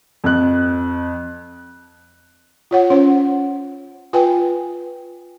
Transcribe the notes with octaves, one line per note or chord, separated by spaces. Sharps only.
F2 F#6
F4 C#5 F#5
C#4 C5
F4 B4 G5 G#5